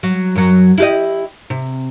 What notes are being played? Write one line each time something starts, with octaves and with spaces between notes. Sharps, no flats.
F#3
F#2 F#3
E4 G4 D#5
C3